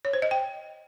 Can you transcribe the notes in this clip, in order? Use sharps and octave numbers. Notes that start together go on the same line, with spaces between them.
C#5
C5
D#5
G5